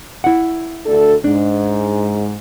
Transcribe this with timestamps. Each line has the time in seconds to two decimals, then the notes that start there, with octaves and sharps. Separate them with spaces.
0.24 E4 F#5
0.85 D2 D4 A4
1.24 G#2 D4